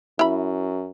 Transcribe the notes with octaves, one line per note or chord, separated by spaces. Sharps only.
F#2 E4 B5